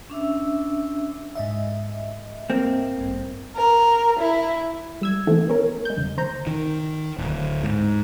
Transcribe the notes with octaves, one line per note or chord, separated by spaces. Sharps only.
C#4 D4 E5 E6
G#2 D#5 E5
A#3 C4
A1 G2
A#4
E4
G3 E6 G#6
C3 D#3 E3 A3 A#3 C4
B3 C#4 A#4
G#3 G6
E2 G2 C#3
D#2 C5 A#5 G6
D#3
D1
G#2